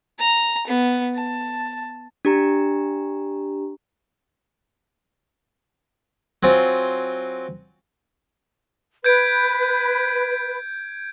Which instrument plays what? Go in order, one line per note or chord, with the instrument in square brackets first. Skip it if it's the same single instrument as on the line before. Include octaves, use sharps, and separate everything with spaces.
[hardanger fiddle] A#5
B3
A5
[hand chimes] D4 G4 A#5
[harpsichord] F#3 C4 F4 G#5
[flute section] B4 [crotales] G6 G#6 D7